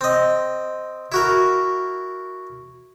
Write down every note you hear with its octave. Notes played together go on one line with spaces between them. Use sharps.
C4 D#5
E4 F#4 A#4